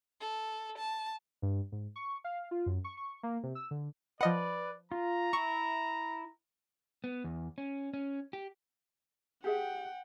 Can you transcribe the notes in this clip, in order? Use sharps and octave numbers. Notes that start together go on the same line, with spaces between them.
A4
A5
G2
G#2
C#6
F5
F4
F#2
C#6
C#6
A#3
C3
E6
D3
F3 B4 D5 D#5 F#5
F4 A#5
E4 E5 C#6
B3
E2
C#4
C#4
G4
G4 G#4 E5 F#5 G5